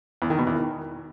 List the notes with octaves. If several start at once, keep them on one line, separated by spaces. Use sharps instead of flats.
E2
D#3
B2
E2
D#3